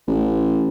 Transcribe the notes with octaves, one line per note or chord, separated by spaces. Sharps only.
A1